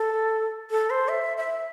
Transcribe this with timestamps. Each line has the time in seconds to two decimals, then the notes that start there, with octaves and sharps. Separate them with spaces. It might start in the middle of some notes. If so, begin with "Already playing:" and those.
Already playing: A4
0.71 A4
0.90 C5
1.08 E5
1.37 E5